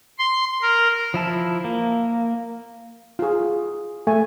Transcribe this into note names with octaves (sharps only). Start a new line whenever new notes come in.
C6
A#4
F3 E4 A5
A#3
F4 G#4
A3 G#5